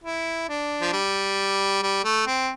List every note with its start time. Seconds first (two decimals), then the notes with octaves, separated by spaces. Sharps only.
0.04 E4
0.49 D4
0.81 F3
0.93 G3
1.82 G3
2.04 A3
2.27 C4